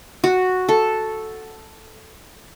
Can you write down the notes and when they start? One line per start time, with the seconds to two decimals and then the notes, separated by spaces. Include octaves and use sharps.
0.24 F#4
0.69 A4